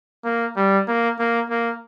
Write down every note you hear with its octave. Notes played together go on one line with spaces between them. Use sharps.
A#3
G3
A#3
A#3
A#3